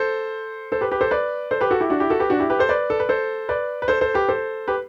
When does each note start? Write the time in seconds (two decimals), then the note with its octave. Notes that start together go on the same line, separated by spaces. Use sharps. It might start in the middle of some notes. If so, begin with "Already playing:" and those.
Already playing: A4 C5
0.72 A4 C5
0.81 G4 B4
0.91 G4 B4
1.01 A4 C5
1.11 B4 D5
1.51 A4 C5
1.61 G4 B4
1.71 F#4 A4
1.80 E4 G4
1.90 D4 F#4
2.00 E4 G4
2.10 F#4 A4
2.19 G4 B4
2.30 D4 F#4
2.39 E4 G4
2.50 G4 B4
2.59 A4 C5
2.69 B4 D5
2.90 A4
3.00 B4
3.09 A4 C5
3.49 B4 D5
3.82 B4
3.88 A4 C5
4.01 A4 C5
4.14 G4 B4
4.29 A4 C5
4.68 G4 B4